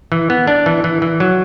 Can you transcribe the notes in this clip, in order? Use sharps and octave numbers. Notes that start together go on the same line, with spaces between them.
E3
B3
D4
E3
E3
E3
F#3